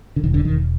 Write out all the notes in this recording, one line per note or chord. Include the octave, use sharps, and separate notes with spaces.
D3
E1 D#3
D3
E1 D#3